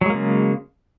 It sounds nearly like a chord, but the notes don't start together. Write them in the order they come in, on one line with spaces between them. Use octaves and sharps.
F#3 G#3 A#3 C#3